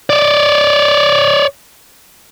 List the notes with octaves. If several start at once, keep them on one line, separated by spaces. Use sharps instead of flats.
C#5 D5